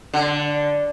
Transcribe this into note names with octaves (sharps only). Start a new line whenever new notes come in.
D3